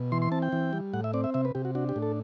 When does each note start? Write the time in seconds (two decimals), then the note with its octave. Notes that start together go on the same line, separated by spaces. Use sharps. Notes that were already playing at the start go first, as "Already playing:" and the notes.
Already playing: B2
0.12 E3 C6
0.22 C6
0.32 C4 A5
0.42 G5
0.52 E3
0.73 G3
0.93 A2 F#5
1.04 E5
1.14 C4 D5
1.24 E5
1.34 C3 E5
1.45 B4
1.55 C3 G4
1.65 F#4
1.75 D4 F#4
1.89 G4
1.96 A2
2.02 A4